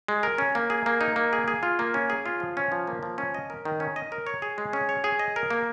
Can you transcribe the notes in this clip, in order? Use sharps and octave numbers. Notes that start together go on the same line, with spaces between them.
G#3
A#4
C#4
A#3
G#4
A#3
D#4
A#3
G#4
G#4
F4
A#3
C#4
G#4
F4
F3
C#4
F3
A#3
F3
C#4
D#5
A#4
D#3
C#4
D#5
A#4
C#5
G#4
G#3
C#4
C#5
G#4
D#5
A#4
A#3